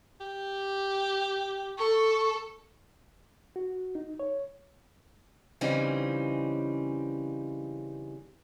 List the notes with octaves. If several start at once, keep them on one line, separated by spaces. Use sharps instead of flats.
G4
A4 C#6
F#4
D#4
C#5
C#3 E3 G3 C4 C#4 D#4